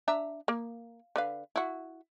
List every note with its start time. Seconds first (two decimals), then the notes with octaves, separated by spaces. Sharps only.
0.08 D4 E5 A#5
0.48 A#3
1.16 D3 B4 F5
1.56 E4 F#4